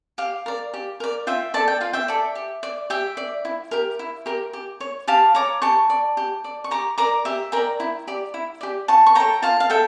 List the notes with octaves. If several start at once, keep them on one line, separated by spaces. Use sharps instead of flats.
G4 F5
A#4 D5
G4
A#4 D5
F4 E5 G5
A4 D5 A5
G5
F4 F5
E5 G5
A4 D5
G4
D5
G4 E5 G5
D5
E4
G4 A#4
E4
G4 A#4
G4
C#5
G4 F5 A5
C#5 A#5 D6
G4 A5 C#6
D5
G4
D5
C#6
G4 A#5 D6
A#4 D5 A#5 D6
G4 E5
A#4 D5 G5 A#5
E4
G4 D5
E4
G4 D5
F4 A5 C#6
C#6
A4 C#5 G5 A#5
F4 F5 A5
F5
A4 E5 G5